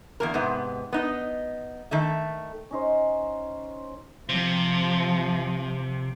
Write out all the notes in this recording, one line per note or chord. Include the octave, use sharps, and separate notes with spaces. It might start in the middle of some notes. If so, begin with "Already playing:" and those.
E2 A#3 A#4
G#2 C3 B3
B3 D#4 D#5
D#3 A3 E5
C#4 D#4 C5
C3 F3